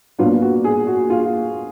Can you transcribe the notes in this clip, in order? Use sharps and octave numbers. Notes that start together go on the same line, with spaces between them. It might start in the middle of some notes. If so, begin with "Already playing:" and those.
A#2 F#3 B3 D4 F4
F#4
G#4
F#4
F4